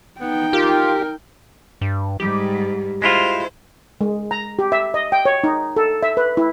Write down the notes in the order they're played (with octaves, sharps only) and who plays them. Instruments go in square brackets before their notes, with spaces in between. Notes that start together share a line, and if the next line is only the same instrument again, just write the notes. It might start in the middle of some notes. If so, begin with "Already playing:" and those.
[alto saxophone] B3 [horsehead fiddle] D#4 G5
[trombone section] F4 [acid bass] G4 [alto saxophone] A#4
[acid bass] G2
[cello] G#2 G3 [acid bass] G4
[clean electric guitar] G#3 E4 F4 [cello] C5
[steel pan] G#3
A#5
G4
E5
D#5
G5
C#5
D#4
A4
E5
B4
E4